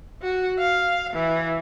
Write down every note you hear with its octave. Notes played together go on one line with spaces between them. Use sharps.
F#4
F5
E3